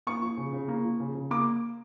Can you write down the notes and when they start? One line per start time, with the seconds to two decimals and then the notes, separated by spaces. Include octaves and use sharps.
0.07 A#3 C#6
0.22 F3
0.37 C#3
0.53 C#3
0.68 A#3
0.84 F3
1.00 C#3
1.15 C#3
1.31 A#3 D6